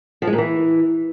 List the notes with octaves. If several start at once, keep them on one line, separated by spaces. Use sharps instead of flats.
F3
G#3
A#2
E3